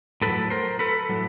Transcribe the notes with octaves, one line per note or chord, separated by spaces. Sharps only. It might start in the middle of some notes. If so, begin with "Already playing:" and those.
A2 F#3 A4 B4
A#4 C5
A4 B4
A2 F#3